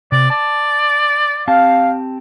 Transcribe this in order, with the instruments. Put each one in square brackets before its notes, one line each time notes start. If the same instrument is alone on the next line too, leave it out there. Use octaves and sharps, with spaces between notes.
[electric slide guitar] C3 [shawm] D5
[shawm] D5 [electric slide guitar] A5
[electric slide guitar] C4 G4 A5 [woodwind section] F5